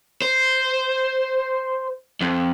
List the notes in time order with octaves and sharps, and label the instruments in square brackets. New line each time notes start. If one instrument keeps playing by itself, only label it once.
[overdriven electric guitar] C5
F2